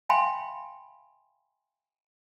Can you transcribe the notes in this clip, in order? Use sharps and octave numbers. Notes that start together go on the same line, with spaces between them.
E5 F5 G5 G#5 B5 C6